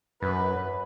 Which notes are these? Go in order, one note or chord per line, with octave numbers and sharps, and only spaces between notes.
F#2 B4